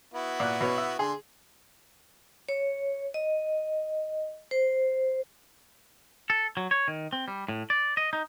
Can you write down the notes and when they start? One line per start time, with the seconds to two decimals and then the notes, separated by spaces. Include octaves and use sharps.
0.14 B3 E4 F#4
0.40 A#2 F#6
0.61 B2 B4 C#5
0.78 E5
0.99 D3 G#4 C6
2.49 C#5
3.14 D#5
4.51 C5
6.30 A4
6.57 F#3
6.71 C#5
6.88 D#3
7.13 C4
7.28 G3
7.49 A2
7.70 D5
7.97 D#5
8.13 D#4